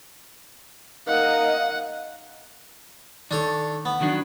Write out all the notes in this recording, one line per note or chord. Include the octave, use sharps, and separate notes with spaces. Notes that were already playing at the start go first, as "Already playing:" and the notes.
A#3 D#4 A#4 D#5 F5 F#5
D#3 D4 A4 C#5
B3
D#3 F#3 D4